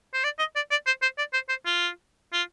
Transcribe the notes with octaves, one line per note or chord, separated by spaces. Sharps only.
C5
D5
D#5
D5
D5
C5
C5
D5
C5
C5
F4
F4